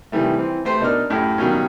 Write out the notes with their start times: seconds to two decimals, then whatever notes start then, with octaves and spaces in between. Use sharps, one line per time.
0.12 C3 D#3 E3 G3 A3
0.38 E3 C4
0.65 A3 G4 B4 C5 G5
0.80 B2 D4 D#4 A#4 D5 F6
1.10 F#2 A2 G4 F6
1.38 B2 D#3 F#3 G3 A#3 C#4